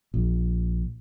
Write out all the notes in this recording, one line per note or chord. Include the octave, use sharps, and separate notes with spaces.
A#1